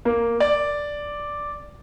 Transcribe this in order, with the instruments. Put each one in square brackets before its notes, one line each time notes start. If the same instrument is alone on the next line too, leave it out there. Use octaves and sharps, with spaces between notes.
[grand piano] A#3
D5